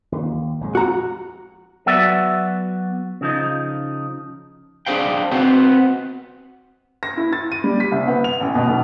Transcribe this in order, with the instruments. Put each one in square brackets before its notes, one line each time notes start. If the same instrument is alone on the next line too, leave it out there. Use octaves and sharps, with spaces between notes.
[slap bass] D#2
A#1 F2 G#3
[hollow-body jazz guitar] F#4 A#5
[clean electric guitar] F#3 B3 F#4 D5 E5
C#3 F3 D#4
D4 D#4 G#4 C5 F5 G5
B3 C4 F#4 C5
[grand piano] A#6
E4
A6
D#7
G3
B6
C2
B3
F7
A1
B2
B1